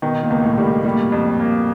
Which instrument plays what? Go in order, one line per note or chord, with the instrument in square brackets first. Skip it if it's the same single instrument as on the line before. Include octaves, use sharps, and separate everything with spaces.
[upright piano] B2 [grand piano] D#3
[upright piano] A#2
[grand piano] C#2
[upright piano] A2
[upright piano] A2 [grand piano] G3
[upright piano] A#2
[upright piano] A#2 [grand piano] G3
[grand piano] F2
A#3